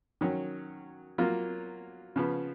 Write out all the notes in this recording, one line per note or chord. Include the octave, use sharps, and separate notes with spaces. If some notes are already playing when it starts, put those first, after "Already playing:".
D#3 F#3 C#4
F#3 A#3 F4
C#3 F3 B3